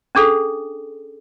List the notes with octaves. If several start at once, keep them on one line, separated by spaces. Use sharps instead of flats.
C#4 D4 G#4 A4